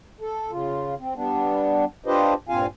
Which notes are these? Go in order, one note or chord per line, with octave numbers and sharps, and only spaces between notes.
A4
C#3 F4
C4
G3 B3 D4
D4 F4 G4 B4 C5 D#5
G2 A#2 C4 F4 F5 G#5